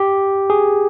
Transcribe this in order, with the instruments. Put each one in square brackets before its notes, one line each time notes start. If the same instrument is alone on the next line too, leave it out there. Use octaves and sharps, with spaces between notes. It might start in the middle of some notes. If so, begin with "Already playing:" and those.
Already playing: [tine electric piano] G4
G#4